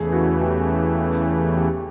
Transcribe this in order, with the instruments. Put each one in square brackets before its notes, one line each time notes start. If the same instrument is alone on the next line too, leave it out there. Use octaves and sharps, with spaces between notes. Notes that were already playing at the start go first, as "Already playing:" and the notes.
Already playing: [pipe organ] E2 C#3 E3 A3 [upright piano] G#4
[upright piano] F#4
G4
G4